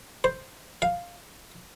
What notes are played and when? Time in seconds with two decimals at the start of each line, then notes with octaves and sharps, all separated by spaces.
0.24 C5
0.82 F5